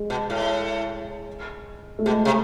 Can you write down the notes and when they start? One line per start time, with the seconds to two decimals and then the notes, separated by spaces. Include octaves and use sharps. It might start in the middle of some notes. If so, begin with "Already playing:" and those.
Already playing: G#3
0.10 B2
0.30 A2
1.99 A3
2.05 B2 G#3
2.25 C3